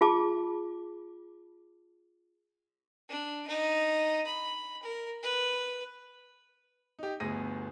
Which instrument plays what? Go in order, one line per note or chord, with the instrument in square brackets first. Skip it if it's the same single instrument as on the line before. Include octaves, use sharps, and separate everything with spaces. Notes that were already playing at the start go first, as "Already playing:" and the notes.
[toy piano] F4 G#4 A5 D6
[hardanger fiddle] D4
D#4
B5
A#4
B4
[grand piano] D#4 G4
G1 D2 B3 G#4 A#6 D#7